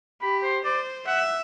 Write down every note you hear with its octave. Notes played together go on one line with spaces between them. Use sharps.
G4 B5
C5
C5 D5
E5 F#5